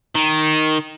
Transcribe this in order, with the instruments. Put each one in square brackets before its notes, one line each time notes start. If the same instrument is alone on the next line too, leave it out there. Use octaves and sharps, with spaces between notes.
[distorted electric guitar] D#3